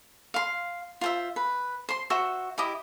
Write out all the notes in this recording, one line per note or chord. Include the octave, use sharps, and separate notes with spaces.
F5 C6
F4 C5 E5
B4
C5 C6
F#4 C5 E5 C#6
E4 G4 D#5 D6